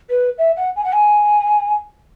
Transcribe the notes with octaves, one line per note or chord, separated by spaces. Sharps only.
B4
E5
F#5
G#5
F#5
G#5